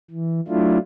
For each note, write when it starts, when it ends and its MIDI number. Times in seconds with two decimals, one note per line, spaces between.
0.10 0.40 52
0.48 0.78 54
0.48 0.78 57
0.48 0.78 62
0.48 0.78 64
0.48 0.78 65